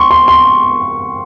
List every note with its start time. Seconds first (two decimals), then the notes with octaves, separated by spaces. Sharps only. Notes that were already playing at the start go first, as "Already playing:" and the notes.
Already playing: C6 C#6
0.11 C6
0.28 C6